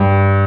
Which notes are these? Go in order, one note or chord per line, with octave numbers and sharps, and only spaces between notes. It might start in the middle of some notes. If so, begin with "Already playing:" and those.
Already playing: G2